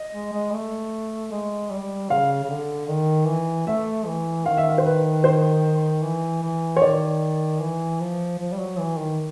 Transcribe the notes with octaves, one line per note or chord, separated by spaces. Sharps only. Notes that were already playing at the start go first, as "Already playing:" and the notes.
Already playing: D#5
G#3
G#3
A3
G#3
G3
C#3 F5
C#3
D3
D#3
E3
A3 E5
E3
D#3 F5
E5
F5
C5
B4
C5
E3
E3
C#5
D#3 D5
E3
F3
F3
G3
F#3
E3
D#3